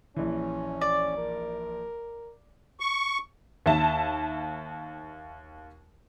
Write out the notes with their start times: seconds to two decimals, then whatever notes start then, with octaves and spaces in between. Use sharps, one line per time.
0.16 A#1 E3 C#4
0.81 D5
1.18 A#4
2.80 C#6
3.66 D#2 E5 A5